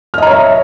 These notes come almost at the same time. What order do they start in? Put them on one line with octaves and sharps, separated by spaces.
F6 D#5 A#5 C#5 E5